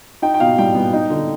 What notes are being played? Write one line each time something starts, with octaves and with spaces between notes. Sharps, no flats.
D#4 G5
G5
B2 F5
G3 G5
B3
D#4
D3